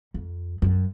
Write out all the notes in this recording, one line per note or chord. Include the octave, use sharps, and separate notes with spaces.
F2
F#2